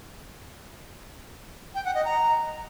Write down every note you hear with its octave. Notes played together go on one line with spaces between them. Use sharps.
G5
F#5
D#5
A#5